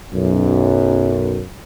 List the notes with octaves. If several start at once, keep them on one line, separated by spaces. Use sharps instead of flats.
B1 F#2